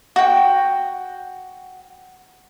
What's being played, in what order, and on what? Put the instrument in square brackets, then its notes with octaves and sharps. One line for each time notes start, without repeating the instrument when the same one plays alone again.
[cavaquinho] F#4 G5